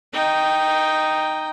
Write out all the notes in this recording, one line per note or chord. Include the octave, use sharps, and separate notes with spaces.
D#4 G5